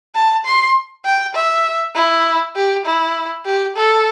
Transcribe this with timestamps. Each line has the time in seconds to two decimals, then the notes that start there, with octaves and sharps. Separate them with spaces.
0.15 A5
0.45 C6
1.05 G5
1.35 E5
1.95 E4
2.55 G4
2.86 E4
3.45 G4
3.76 A4